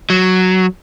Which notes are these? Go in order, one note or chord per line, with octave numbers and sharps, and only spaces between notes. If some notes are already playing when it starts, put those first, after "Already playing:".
F#3